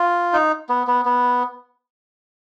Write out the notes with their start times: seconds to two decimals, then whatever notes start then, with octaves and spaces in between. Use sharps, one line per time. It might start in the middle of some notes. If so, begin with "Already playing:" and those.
Already playing: F4
0.33 D#4
0.69 B3
0.87 B3
1.05 B3